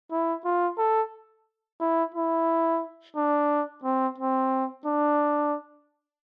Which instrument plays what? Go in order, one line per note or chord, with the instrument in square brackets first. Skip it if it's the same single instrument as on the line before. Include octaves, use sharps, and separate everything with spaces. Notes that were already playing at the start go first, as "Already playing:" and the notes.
[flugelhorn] E4
F4
A4
E4
E4
D4
C4
C4
D4